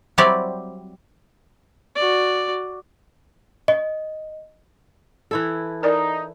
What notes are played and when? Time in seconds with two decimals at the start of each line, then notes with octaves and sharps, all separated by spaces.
0.18 F#3 G3 C4 E4 G4 D5
1.95 F#4 D5
3.68 D#5
5.31 E3 E4 A4
5.83 D#4 A#4 D5